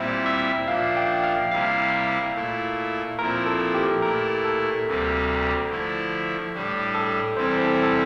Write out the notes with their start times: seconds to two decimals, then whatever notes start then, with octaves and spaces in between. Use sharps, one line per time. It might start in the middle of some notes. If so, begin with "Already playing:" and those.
Already playing: A#2 G3 C4 E4 E5
0.26 E5
0.68 A#2 F3 A#3 D4 F5
0.96 G5
1.24 F5
1.51 C3 G3 A#3 E4 F5
2.35 A#2 A3 E4
3.18 A#2 F3 C4 E4 A#4
3.46 A4
3.74 G4
4.02 A#2 A3 E4 A#4
4.44 A4
4.86 D2 C3 G3 A#3
5.69 D3 F3 A3 E4
6.53 A2 G3 D4
6.95 A4
7.36 E2 C3 G3 C4 E4 C5
7.64 A4
7.83 A4